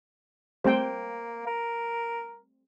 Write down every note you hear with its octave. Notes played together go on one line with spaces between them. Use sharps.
G3 A3 A#3 C4 C5 G5
A#4